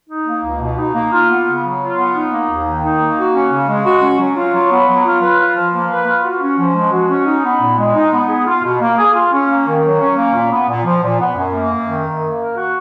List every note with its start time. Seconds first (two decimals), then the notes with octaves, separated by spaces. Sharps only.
0.08 D#4
0.26 A#3
0.44 C#2
0.61 B2
0.77 D#4
0.94 A#3
1.11 F4
1.29 B3
1.46 C#3
1.63 F#3
1.80 F4
1.97 B3
2.15 D#4
2.31 A#3
2.48 D#2
2.65 D#3
2.82 D#4
3.00 A#3
3.17 F#4
3.34 C#4
3.51 C#3
3.68 G#3
3.85 F#4
4.02 C#4
4.19 F#3
4.36 F4
4.54 F#3
4.71 B3
4.87 F#3
5.04 F4
5.21 B4
5.39 F4
5.56 F3
5.73 A#3
5.90 B4
6.06 F4
6.24 F#4
6.41 C#4
6.59 F3
6.75 G#3
6.92 F#4
7.10 C#4
7.26 D#4
7.44 B3
7.61 A#2
7.78 G#3
7.95 D#4
8.13 B3
8.29 G#4
8.47 F4
8.63 B2
8.81 A#3
8.97 G#4
9.14 F4
9.32 C#4
9.48 A#3
9.66 D#3
9.83 F#3
10.00 C#4
10.17 A#3
10.34 A#2
10.51 B3
10.68 A#2
10.85 F3
11.03 A#2
11.20 B3
11.36 F#2
11.53 A#3
11.71 F#2
11.88 D#3
12.05 F#2
12.23 A#3
12.39 A#4
12.56 F#4